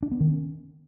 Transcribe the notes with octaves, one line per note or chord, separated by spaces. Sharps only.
D4
B3
D#3
C#4